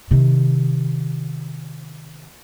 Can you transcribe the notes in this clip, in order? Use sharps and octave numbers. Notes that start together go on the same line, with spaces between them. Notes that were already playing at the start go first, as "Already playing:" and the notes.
C3 D#3